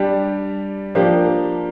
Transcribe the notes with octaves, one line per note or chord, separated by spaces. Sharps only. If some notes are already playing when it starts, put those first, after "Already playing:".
Already playing: G3 D4 G4
F3 A#3 D4 G4